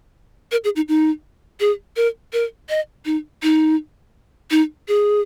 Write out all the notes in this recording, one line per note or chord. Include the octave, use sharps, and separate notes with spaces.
A#4
G#4
D#4
D#4
G#4
A#4
A#4
D#5
D#4
D#4
D#4
G#4